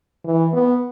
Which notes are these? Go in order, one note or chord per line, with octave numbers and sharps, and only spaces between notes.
E3
B3